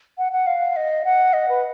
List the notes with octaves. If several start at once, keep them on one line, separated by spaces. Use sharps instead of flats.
F#5
F#5
F5
D#5
F#5
D#5
B4